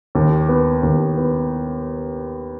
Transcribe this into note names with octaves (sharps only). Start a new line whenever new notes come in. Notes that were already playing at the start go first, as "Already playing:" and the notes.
D#2
B3
D#2
B3